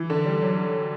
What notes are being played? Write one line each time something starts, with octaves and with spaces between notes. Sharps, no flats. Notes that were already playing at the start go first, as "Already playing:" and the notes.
Already playing: E3
D3
G3
F#3